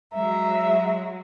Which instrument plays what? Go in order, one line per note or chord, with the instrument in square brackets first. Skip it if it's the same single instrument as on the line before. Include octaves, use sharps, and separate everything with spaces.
[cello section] F#3 G#3 [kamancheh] E5 A#5